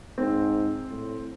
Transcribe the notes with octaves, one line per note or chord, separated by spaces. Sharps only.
G#2 C4 C5
A2